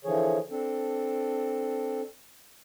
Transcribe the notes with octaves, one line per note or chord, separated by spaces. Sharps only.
D3 E3 F3 G#4 C#5
C4 D4 A4